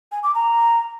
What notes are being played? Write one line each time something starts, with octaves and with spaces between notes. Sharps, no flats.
G#5
D6
A#5